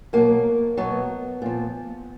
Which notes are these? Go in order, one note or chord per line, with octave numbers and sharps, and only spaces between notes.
B2 F#3 A#3
B2 F#3 B3
A#2 F3